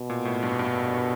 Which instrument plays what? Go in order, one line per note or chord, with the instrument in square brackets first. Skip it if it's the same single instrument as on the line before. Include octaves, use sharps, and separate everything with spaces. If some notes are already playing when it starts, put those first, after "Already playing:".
Already playing: [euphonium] B2
[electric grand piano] A#2
A2
G2
G2